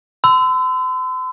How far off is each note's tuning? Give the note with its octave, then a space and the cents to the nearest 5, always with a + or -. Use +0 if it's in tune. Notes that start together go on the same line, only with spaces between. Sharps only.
C6 -45 E6 +0